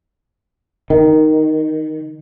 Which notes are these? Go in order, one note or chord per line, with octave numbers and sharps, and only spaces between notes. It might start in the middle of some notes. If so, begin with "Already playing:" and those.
D#3